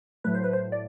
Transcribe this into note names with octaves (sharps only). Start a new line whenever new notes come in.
A2 F#3 A3 B4
C5
B4
C5
D5